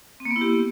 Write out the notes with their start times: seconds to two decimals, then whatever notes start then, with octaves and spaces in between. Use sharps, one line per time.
0.20 C4
0.25 A#3
0.31 B3
0.36 E4
0.41 G4